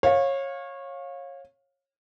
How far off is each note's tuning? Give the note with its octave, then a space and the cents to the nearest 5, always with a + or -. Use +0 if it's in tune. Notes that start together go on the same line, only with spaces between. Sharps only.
C#5 -20 F5 +15